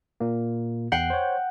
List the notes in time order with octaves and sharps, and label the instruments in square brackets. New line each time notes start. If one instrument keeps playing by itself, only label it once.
[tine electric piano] A#2 A#3
[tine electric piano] E2 C7 [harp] F#5 G5
[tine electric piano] C5 C#5